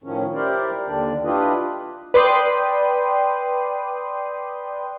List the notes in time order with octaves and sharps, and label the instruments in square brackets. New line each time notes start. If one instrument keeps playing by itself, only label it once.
[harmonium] A2 D#3 F3 C#4
E4 G4 A#4 C5 D5
D#2 D3 G3 D4 D5
D4 E4 F4 G4 B4 D#5
[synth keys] B4 D5 G5 C6 D#6